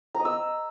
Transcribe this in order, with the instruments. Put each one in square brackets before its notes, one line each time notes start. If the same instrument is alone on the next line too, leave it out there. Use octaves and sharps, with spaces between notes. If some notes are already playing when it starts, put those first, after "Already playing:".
[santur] A#5
D#5
E6